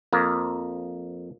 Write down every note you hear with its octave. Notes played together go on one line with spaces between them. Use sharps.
F2 A#3